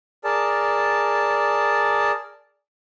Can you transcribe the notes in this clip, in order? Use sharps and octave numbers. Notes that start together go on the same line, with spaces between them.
G#4 A#4 D5 A5